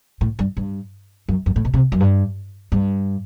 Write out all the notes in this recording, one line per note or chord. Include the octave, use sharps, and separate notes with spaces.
A2
G2
G2
F#2
F#2
A2
B2
C3
F#2
G2
G2